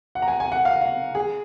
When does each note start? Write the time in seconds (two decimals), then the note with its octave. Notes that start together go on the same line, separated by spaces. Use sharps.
0.15 F#5
0.22 A#5
0.28 G#5
0.40 G#5
0.52 F#5
0.65 F5
0.81 F5
1.15 G#4